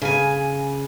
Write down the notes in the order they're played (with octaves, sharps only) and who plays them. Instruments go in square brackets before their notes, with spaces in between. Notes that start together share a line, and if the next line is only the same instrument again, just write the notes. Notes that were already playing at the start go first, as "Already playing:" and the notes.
[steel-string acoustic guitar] C#3 G#5